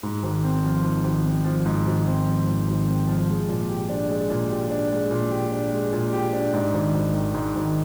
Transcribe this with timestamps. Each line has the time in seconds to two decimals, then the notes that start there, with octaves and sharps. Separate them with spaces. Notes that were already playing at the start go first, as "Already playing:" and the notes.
0.03 G#2
0.23 G#1
0.44 C4
0.64 F3
0.84 G#2
1.04 G#1
1.25 C4
1.44 F3
1.65 G#2
1.86 G#1
2.06 C4
2.27 F3
2.46 G#2
2.67 G#1
2.87 C4
3.07 F3
3.28 G#3
3.49 A#2
3.69 G4
3.89 D4
4.09 G#3
4.30 A#2
4.50 G4
4.70 D4
4.91 G#3
5.11 A#2
5.31 G4
5.52 D4
5.72 G#3
5.93 A#2
6.13 G4
6.33 D4
6.53 G#2
6.74 G#1
6.93 G#1
7.14 D#3
7.34 G#2
7.55 G#1